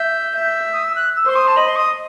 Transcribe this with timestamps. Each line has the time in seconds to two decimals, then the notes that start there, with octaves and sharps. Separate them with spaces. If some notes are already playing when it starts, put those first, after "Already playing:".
Already playing: E5 G6
0.35 E5
0.73 D#6
0.85 E6
0.95 F#6
1.16 E6
1.26 C5 C6
1.36 D#6
1.47 A5
1.56 D#5 B5
1.68 C6
1.76 D#6